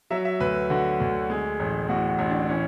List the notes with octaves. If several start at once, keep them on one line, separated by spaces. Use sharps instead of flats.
F#3 E5
E5
D2 B4
D3 F#4
D2
G#3
A1
A2 F#4
F#4
A1
D4
E3 C#4